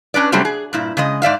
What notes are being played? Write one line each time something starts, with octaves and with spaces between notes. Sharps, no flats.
C#4 D4 B4 D5
C3 F#3 G3 A3 C4 C#4
G#4
G2 A#2 E4
C#3 G#3 D#5
G#2 D5 E5 F5